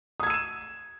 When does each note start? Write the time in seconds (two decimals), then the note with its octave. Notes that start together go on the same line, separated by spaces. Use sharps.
0.20 D#6
0.23 G#6
0.27 E6
0.30 D#7
0.34 E7